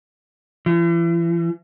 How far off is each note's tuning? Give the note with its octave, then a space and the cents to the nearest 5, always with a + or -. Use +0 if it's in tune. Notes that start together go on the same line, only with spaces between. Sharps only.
E3 +40